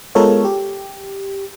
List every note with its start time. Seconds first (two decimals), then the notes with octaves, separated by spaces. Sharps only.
0.15 G#3 B3 F4 A4 A#4 C#5
0.45 G4